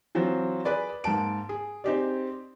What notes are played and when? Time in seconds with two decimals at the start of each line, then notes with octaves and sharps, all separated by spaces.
0.15 E3 F#3 C4 F4
0.65 G#4 B4 D5
1.04 G#2 A#3 A5 D7
1.49 G#4
1.84 C4 D#4 G4 G#4 D5